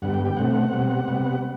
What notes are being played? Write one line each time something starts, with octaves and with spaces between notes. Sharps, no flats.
G2 D3 G3 B3 F#5
G5
G5
B2 A3 C4 F#5
B2 G3 C4
C3 G3 B3